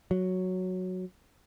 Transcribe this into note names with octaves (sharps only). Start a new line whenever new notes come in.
F#3